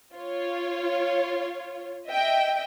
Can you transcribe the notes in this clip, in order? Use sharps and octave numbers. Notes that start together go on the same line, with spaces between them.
F4 C#5
D#5 E5 G5